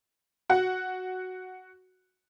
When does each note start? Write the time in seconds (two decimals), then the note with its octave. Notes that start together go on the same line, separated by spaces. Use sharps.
0.50 F#4 F#5